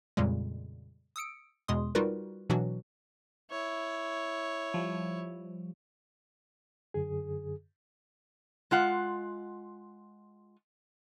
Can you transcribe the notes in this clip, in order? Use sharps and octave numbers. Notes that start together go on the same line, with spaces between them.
F2 A#2 C#3 G3 G#3
D#6 E6 C#7 D7
E2 B2 G#3 C6 D#6
G3 D#4 F4 F#4 A#4 B4
B2 E3 F#3 D4 F#4
E4 C#5
F3 G3
F#2 D3 G#4
G#3 F4 F#5